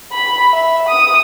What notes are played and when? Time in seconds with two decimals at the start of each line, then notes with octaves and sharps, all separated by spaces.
0.12 B5
0.53 E5
0.88 D#6